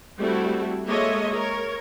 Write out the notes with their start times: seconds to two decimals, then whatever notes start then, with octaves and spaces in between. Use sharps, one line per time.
0.19 G3 A3 C4 E4 F#4 A4
0.87 G#3 A#3 A4 C#5 D#5 E5
1.33 A#4 C#5